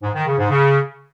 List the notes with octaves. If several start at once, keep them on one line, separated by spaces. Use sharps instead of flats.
G#2
D#3
C#3
G#2
C#3